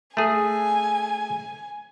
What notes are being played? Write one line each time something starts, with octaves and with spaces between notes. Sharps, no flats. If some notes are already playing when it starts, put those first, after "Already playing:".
A3 G#4 G#5